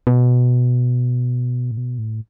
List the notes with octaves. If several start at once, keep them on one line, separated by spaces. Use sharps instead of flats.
B2
A2
B2
A2